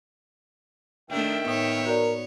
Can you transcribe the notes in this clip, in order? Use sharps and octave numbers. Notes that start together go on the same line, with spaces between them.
D#3 A3 D4 E5 G5
A2 B3 D#4 C#5
F#4 A#4 D5